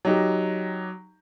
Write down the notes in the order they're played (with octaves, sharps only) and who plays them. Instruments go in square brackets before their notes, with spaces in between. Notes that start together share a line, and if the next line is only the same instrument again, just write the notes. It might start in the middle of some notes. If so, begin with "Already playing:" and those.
[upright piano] F#3 D#4 G4